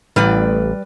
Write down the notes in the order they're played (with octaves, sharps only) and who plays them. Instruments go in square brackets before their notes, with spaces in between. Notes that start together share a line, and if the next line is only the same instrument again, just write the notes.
[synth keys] A1 [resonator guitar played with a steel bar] G3 B4 D5